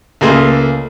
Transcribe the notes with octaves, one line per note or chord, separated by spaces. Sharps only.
C#2 A3 A#3 G#4 C6